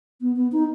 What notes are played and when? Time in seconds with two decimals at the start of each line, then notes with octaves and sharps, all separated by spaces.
0.21 B3
0.36 B3
0.52 D#4